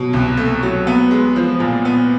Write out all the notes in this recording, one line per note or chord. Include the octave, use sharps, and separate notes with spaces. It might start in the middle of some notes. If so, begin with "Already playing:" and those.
Already playing: B2 F#3
C2
A3
F#3
B3
G#3
F3
A#2
B3